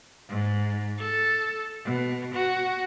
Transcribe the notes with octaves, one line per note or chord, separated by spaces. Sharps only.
G#2
A4
B2
F#4